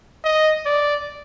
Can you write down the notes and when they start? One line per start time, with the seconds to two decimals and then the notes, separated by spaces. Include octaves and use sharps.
0.24 D#5
0.65 D5